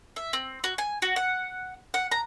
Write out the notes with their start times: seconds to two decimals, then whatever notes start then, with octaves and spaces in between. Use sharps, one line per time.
0.16 E5
0.33 C4
0.64 F#4
0.78 G#5
1.02 F#4
1.16 F#5
1.94 F#5
2.11 A#5